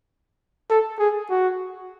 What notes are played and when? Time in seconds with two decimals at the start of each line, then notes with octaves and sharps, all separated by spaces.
0.70 A4
0.99 G#4
1.30 F#4